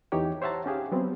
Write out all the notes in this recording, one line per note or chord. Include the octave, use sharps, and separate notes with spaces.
E2 E3 D#4 G4 C#5 G5
C5 C#5 E5 F#5 A5 A#5
C#4 G4 G#4 F5
F#3 B3 C4